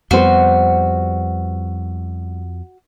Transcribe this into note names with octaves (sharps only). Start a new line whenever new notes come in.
F2 G3 B3 F#4 C5